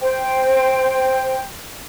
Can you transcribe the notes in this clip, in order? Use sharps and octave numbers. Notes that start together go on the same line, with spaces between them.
C5 G5